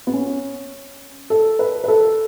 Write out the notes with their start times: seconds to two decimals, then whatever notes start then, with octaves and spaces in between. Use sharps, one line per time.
0.07 B3
0.14 C#4
1.30 A4
1.59 B4
1.84 B4
1.88 A4